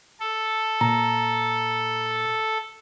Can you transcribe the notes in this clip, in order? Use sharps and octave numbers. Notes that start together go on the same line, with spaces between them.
A4
A#2 A#5